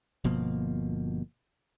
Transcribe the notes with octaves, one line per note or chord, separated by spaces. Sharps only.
G1 B2 F3 A#3